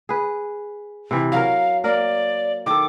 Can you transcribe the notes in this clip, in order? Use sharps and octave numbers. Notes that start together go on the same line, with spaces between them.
G#4 B4
C3 E3
F#3 A#4 F5
A#3 A#4 D5
D#3 A4 D6